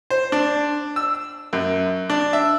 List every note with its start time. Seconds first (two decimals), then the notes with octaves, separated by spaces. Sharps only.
0.10 C5
0.32 D4
0.96 E6
1.53 F#2
2.10 D4
2.33 E5